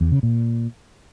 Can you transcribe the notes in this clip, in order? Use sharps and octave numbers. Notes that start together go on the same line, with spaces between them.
E2
C#3
A#2